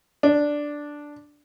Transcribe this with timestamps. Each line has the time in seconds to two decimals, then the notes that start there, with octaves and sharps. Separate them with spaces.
0.23 D4